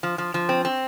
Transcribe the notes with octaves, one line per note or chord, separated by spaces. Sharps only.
F3
F3
F3
C4
C4